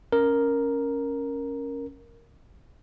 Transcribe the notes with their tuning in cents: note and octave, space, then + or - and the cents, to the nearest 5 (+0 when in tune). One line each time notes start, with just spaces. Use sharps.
C#4 +0 A#4 +0